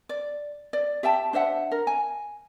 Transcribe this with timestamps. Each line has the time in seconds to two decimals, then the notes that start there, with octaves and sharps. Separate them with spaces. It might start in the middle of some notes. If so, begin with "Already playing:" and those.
0.09 D5
0.73 D5
1.03 G4 E5 G5 A5
1.33 D4 C5 E5 F#5
1.71 A#4
1.87 G#5